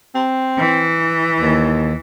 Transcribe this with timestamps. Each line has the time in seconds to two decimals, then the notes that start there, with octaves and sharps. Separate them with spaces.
0.15 C4
0.57 E3
1.41 D#2